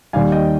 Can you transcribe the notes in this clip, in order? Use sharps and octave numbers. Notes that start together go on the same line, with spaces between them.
D#2 D#3 G3 F5 G#5
D#5 G5